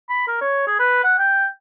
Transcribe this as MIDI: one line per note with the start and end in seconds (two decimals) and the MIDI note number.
0.09 0.25 83
0.27 0.41 70
0.41 0.64 73
0.67 0.74 68
0.79 1.04 71
1.04 1.13 78
1.18 1.47 79